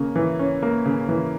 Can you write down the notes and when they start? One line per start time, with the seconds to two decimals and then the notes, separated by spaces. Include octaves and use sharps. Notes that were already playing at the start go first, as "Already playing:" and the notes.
Already playing: C#3 A#3 C#4
0.16 E3
0.39 C#4
0.62 A#3
0.86 C#3
1.09 E3